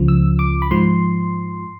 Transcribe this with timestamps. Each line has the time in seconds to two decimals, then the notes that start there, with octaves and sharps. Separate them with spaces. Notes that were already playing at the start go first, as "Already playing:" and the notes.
Already playing: C#2 C#3 F3
0.08 E6
0.39 D6
0.62 B5
0.71 G#2 F3 C6